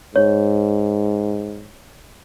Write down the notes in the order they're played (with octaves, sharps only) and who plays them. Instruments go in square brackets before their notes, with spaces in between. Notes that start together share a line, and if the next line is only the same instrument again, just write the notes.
[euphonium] G#2 [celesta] C#5